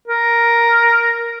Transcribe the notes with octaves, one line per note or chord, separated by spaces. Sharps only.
A#4